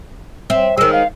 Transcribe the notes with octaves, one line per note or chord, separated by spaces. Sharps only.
C4 E5
D#3 G#3 E6
F5